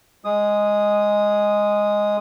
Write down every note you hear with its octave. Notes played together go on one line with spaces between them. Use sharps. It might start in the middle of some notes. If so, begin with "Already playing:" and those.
G#3 D#6